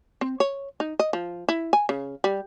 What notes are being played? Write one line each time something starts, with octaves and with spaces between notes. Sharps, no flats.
C4
C#5
D#4
D#5
F3
E4
G#5
C#3
G3